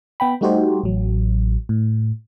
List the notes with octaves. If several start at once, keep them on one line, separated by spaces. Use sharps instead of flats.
B3 G5 B5
G3 A3 D#4 F#4 G4 C5
A1 F#3
A2